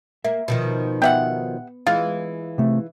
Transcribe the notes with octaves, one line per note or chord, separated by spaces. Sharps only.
A#3 E5
B2 D#3 F3
B3 G4 E5 F#5
E3 G#3 E4 F4
C3 A3